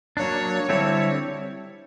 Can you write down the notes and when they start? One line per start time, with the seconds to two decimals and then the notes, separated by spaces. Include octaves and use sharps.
0.17 F#3 A#3 D4 C#5
0.68 D3 G3 C4 E4 A4 C#5